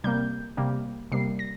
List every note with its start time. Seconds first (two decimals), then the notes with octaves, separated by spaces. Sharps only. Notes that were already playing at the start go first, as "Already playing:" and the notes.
0.04 C3 G3 A#3 G6
0.57 C3 G3 A#3
1.12 C3 G3 A#3 C7
1.39 A#6